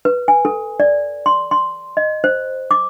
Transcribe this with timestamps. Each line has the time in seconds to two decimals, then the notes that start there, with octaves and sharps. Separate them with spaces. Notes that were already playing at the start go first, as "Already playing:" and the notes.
0.05 B4
0.28 G#5
0.45 A4
0.80 D5
1.26 C6
1.51 C6
1.97 D#5
2.24 C5
2.71 D6